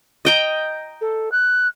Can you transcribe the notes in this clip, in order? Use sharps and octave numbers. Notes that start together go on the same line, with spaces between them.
D#5 G5 A#5
A4
F#6